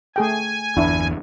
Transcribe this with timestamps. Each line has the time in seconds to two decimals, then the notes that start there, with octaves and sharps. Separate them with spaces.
0.16 A3 G#4 G5 G#5
0.77 G1 E2 D4 E4